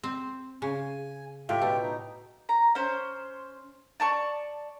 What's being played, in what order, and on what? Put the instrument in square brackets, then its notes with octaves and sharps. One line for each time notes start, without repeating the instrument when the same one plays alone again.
[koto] C4
[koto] C#3 [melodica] G#5
[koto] A2 [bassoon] F4 [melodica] G4 E5 G5
[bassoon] B2 [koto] A3
[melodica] D#4
[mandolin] A#5
C#4 C5
D5 A5 C#6